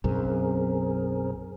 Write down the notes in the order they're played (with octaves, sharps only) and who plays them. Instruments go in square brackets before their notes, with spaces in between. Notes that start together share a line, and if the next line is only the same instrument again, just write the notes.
[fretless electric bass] B1 F#2 [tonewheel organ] C4 G#4 A#4